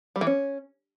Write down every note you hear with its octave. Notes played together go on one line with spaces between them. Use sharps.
G3
E3
C#4